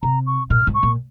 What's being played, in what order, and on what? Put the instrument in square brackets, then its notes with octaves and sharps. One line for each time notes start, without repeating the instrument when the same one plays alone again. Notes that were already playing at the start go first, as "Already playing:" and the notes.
[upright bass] C3 [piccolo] A#5
[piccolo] C#6
[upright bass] A#2 [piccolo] F6
[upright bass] G#2
[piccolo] C#6
[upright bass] A#2